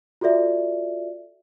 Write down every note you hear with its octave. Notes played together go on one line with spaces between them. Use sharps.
F4 F#4 A4 D5 E5